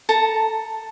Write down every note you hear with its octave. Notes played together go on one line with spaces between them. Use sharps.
A4 A5 A#5